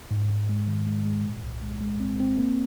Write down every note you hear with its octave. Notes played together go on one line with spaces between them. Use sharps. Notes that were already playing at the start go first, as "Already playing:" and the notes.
G#2
G#2
G#3
D#3
G#3
G#3
A#2
C2
G#3
G#3
C4
C4
A#3